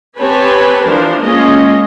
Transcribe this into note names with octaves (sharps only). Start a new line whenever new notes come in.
C4 G4 B4 C#5 G#5 A5
E3 F3 D4 A#4 C5
G#3 A#3 C#4 F4 D#5